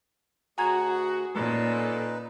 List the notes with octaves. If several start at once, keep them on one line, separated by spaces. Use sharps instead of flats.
D2 F#4 G#4 G#5 A#5 G#6
A#2 C#4 D#4 A4 B4